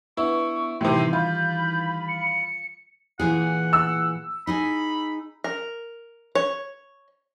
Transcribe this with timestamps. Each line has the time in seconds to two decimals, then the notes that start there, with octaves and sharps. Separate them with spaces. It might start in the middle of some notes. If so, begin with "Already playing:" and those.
0.17 B3 D4 E4 C#6
0.81 A2 C3 D#3 E3 G3 G5 C6
1.13 F4 B5 G6
2.08 C#7
3.20 A#2 E3 G#4 F#5
3.73 E6
4.47 D#4 G#4 G#5 B5
5.44 A#4
6.35 C#5